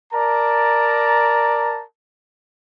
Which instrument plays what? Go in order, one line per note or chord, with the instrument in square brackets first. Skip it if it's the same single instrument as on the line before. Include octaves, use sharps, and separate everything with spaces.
[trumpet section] A#4 D5 A5 A#5